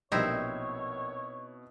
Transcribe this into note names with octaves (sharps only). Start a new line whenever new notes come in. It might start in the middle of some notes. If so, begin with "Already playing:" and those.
A#1 B2 G3 C4 D#4 E4 C#5 E6